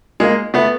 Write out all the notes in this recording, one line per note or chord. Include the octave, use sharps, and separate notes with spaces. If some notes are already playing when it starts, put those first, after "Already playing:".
G#3 A#3
A3 B3